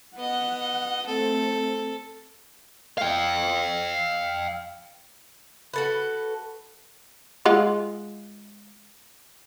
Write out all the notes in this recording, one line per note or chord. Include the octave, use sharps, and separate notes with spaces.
B3 D#5 F#5
A3 C4 A4
F5 G5
F#4 A4 B4
G#3 F4 F#5